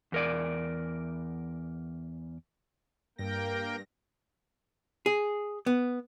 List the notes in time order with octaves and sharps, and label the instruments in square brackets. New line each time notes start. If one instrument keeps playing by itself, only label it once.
[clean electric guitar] E2 A#4 D5
[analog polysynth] G2 A#6 [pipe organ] A#3 A#4 G5
[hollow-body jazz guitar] G#4
B3